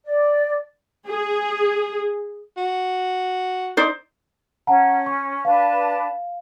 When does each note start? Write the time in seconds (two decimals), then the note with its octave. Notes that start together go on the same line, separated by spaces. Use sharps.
0.05 D5
1.09 G#4
2.57 F#4
3.77 D#4 C5 D5
4.67 C#4 F#5 A5 A#5
5.06 C#6
5.45 D4 B4 F5 A5